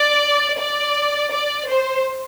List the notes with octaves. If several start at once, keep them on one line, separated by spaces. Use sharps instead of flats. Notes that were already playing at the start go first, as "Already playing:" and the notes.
Already playing: D5
D5
D5
C5